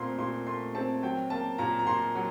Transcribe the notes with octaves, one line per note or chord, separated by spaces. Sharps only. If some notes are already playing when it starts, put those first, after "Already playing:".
Already playing: A#2 A3 C4 A#5 C6
A#2 C6
A3 C6
C4 A5
F#3 G5
A#3 A5
A#2 A#5
A#5
A#2 C6
F#3